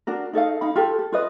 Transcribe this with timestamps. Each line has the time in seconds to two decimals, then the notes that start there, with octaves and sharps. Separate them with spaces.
0.07 D4 F#4 A#4
0.33 D#4 A4 D#5 F5
0.61 D#4 F5 B5
0.76 F4 G4 A4
0.99 A4
1.12 F4 B4 D#5